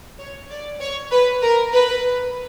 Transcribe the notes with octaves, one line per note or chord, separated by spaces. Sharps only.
C#5
D5
C#5
B4
A#4
B4